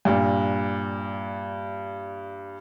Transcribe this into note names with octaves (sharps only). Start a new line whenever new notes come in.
G2 A#2